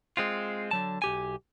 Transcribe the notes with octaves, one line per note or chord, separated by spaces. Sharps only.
G#3 C4 F4
D3 F#3 A5
B1 G4 G#5